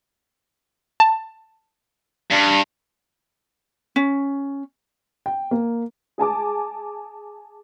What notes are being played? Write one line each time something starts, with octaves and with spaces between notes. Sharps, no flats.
A5
G2
C#4
G5
A#3
G#4 G#5 A5 D6